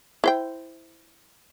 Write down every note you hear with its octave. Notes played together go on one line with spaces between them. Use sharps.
E4 C5 G5